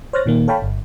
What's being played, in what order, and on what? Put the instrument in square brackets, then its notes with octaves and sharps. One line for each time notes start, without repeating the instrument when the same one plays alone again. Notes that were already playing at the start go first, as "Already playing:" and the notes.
[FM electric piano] C5 C#5 F6 F#6 A6 A#6
A#2 D#3 A#3
A4 C#5 F5 G5 A5 B5
G1